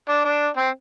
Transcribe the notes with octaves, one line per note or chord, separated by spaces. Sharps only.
D4
D4
C4